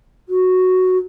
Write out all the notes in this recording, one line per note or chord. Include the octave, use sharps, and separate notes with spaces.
F#4